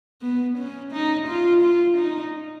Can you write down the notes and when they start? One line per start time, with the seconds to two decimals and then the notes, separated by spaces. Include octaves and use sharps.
0.22 B3
0.58 C#4
0.93 D#4
1.28 F4
1.63 F4
1.98 D#4